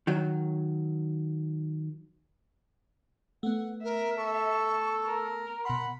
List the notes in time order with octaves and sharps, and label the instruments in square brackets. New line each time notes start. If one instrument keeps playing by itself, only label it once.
[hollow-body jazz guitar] D#3 F#3
[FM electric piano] A3 B3 [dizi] F#5
[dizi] A#4 [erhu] E5
[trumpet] A4 [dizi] C#6
[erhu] A#4
[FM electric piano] B2 C6 [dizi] F#5 [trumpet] B5